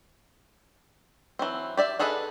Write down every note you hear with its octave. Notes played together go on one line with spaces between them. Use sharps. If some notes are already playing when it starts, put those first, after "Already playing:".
E3 F#3 C4
G4 D5 E5
D4 G#4 A4 B4 D#5